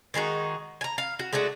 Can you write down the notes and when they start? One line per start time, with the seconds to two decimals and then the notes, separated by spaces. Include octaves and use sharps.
0.14 D#3 G#3 D#4 F#4
0.81 G#5 A#5
0.98 F5
1.19 F#4
1.33 G#3 A3 D4 F#4